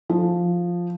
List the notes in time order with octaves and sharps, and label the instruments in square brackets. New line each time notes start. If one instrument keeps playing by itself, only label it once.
[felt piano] F3